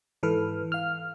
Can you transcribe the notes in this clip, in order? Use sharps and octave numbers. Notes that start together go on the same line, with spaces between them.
G#2 E3 A4 B4 F6
F5 F6